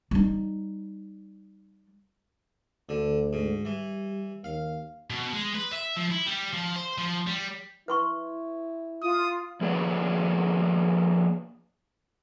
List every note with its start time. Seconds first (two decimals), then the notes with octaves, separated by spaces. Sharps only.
0.11 G3 D#4
2.89 D2 D3
3.33 G#2
3.65 E3 G3
4.44 D#2 F5
5.10 B2
5.32 G#3
5.55 B4
5.73 E5
5.97 F3
6.11 E4
6.27 G3
6.53 F3
6.76 C5
6.98 F3
7.27 G3
7.88 E4 B4 C6 C#6
9.02 F4 D#6
9.61 F3 A#3 G#4 B4 C#5 D5